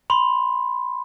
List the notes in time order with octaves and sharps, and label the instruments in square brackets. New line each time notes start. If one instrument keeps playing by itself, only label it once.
[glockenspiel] B5 C6